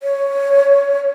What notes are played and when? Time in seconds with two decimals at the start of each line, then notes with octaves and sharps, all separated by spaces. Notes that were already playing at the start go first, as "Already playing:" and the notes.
0.03 C#5